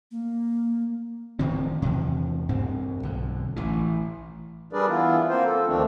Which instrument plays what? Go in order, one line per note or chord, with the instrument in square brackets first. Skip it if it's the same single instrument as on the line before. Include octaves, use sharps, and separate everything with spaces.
[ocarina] A#3
[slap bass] D1 D#3 F3 C4
E2 C3
G2 C4
B1 D3
A1 E3
[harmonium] G3 D4 G#4 A#4 B4 D5
E3 B3 E4 F4
A#3 C4 F4 A#4 C5
A4
D2 D#3 F3 A3 C4 D4